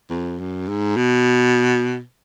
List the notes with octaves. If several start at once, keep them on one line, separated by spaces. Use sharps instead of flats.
F2
F#2
G#2
B2